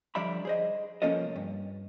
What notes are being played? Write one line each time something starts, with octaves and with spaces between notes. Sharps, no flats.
D3 F3 G3 D5 E5 B5
G#4 C5 D#5
C2 F3 A#3 C#4 A4 D#5
G2